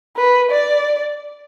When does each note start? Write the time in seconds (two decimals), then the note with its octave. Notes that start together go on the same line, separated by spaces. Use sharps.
0.17 B4
0.51 D5